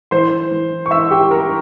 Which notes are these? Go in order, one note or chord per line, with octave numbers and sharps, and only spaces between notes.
E3 C5 C6
E3
C#6
E3 E5 E6
G4 G5
G3 A#4 A#5